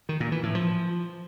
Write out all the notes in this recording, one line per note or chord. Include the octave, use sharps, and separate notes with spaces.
D#3
A#2
E3
A2
F3